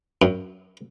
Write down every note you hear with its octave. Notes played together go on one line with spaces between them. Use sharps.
F#2